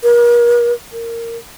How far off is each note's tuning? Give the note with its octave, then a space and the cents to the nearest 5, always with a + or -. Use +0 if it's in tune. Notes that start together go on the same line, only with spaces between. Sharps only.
A#4 +40
A#4 -15